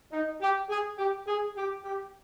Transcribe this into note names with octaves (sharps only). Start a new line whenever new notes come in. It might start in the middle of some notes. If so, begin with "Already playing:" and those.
D#4
G4
G#4
G4
G#4
G4
G4